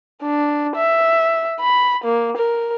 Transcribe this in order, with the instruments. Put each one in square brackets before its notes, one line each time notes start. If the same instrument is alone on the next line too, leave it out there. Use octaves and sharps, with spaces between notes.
[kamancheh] D4
E5
B5
A#3
A#4